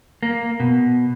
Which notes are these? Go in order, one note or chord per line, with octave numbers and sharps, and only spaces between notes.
A#3
B2